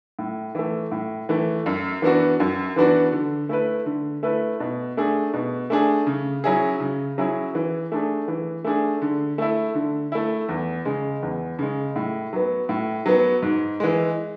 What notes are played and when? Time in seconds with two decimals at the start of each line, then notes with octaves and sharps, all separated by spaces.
0.19 A2
0.55 E3 A3
0.92 A2
1.29 E3 A3
1.66 F#2
2.02 E3 B3 D4 F#4
2.40 F#2
2.76 E3 B3 D4 F#4
3.12 D3
3.49 A3 E4 B4
3.86 D3
4.23 A3 E4 B4
4.60 B2
4.97 A3 D4 G#4
5.34 B2
5.70 A3 D4 G#4
6.07 C#3
6.44 F#3 C#4 E4 G#4
6.80 C#3
7.18 F#3 C#4 E4 G#4
7.55 E3
7.92 A3 D4 G#4
8.28 E3
8.64 A3 D4 G#4
9.02 D3
9.38 A3 E4
9.75 D3
10.12 A3 E4
10.49 E2
10.85 C#3 G#3
11.22 E2
11.59 C#3 G#3
11.96 A2
12.33 F#3 B3
12.69 A2
13.06 F#3 B3
13.42 G#2
13.80 E3 G#3